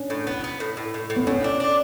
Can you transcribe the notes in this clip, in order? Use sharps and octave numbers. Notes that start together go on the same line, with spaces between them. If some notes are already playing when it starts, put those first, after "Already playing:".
Already playing: C#4 D4
A2
B3
B3
A2
A2
A2
A2
B3
A2 C#4
D4
D4